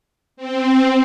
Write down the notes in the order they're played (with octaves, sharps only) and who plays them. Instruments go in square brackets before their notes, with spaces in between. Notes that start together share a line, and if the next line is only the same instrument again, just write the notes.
[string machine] C4